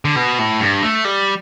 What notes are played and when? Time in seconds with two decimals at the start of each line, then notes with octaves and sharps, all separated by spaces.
0.05 D3
0.16 B2
0.39 A2
0.60 G2
0.83 A3
1.05 G3